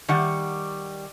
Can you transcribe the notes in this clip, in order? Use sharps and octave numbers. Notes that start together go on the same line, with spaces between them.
D#3 G3 F#5